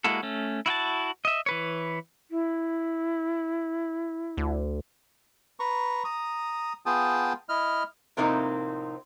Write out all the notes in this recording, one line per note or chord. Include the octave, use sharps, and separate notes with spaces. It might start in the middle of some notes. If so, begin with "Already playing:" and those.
G#3 A#3 E4 F#4 A4
A3 C#4
E4 F#4 G5 A5
D#5 E5
E3 B4 C#5
E4
D2
B4 A#5 C#6
A#5 D#6
B3 F4 G#4 G5 A5 D#6
E4 D#5 F6
A2 C3 F3 A#3 C4 D#4